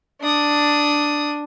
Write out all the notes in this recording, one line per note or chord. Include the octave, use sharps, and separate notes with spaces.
D4 D#6